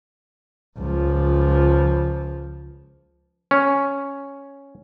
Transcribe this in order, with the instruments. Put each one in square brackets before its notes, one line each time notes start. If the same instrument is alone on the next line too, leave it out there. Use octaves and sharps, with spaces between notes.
[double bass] C#2 F3
[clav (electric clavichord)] C#4